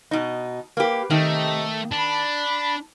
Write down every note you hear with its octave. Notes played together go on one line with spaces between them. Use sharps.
B2 D#4
A#3 G4 B4
C3 D#3 A3 D#4 G4
D4 A5 B5